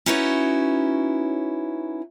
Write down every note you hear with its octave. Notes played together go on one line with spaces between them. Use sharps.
C#4 D#4 E4 F#4 B4 C#5